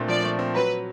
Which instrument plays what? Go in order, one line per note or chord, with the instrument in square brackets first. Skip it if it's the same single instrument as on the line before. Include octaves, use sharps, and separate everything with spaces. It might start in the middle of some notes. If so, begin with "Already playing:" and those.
Already playing: [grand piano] A#2 A3 C4 D4
[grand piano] F3 [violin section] D5
[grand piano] A3
C4
[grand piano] F#3 [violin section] B4